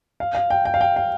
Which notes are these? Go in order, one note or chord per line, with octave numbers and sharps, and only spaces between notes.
F5
F5
G5
G5
F5
G5
F5